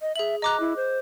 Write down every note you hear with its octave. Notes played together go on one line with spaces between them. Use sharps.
D#5
G#4 E5 F#7
D#5 A#5 D6 F#6
E4
C5